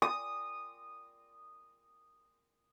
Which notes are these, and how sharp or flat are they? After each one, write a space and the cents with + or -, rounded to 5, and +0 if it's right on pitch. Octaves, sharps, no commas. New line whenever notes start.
D#6 -10